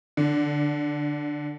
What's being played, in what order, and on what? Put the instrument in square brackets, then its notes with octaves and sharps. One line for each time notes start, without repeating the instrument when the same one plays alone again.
[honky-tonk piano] D3